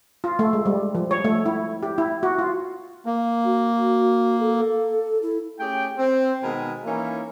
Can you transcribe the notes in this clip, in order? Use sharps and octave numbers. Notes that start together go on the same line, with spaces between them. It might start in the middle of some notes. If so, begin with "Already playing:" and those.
F4
A3
G#3
G3
F3
C#5
A3
E4
G4
E4
F#4
F4
A#3
F#4
A4
E4
A3 C#4 G4 G#4 G5
C4
B2 D#3 G#3 A#4 G#5 B5
E3 A#3 C#4 D#4 E4